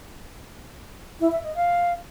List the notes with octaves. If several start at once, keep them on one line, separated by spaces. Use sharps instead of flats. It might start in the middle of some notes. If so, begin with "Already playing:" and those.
E4
E5
D#5
F5